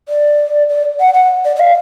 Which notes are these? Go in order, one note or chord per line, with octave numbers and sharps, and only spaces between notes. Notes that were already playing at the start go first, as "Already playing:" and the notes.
D5
D5
F#5
F#5
D5
D5
F5